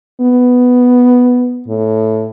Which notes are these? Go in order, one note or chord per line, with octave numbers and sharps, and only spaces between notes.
B3
A2